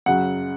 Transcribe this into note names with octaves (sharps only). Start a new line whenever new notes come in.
F#2 C#3 F#3 F#5